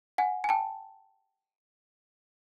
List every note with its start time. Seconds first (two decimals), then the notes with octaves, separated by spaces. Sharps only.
0.18 F#5 G#5
0.44 G#5
0.49 G5 A5